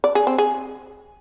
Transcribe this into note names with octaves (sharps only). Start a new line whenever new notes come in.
D5
G#4
C4
G#4